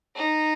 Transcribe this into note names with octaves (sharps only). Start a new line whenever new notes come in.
D#4